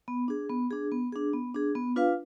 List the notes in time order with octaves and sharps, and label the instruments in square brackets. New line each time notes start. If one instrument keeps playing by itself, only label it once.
[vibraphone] B3
D4 G#4
B3
D4 G#4
B3
D4 G#4
B3
D4 G#4
B3
D4 F4 B4 F5